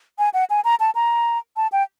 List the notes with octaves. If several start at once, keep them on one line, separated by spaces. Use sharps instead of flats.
G#5
F#5
G#5
A#5
A5
A#5
A5
G5